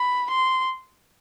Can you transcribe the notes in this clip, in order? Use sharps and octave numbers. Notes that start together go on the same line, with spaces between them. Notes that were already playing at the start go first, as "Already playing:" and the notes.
Already playing: B5
C6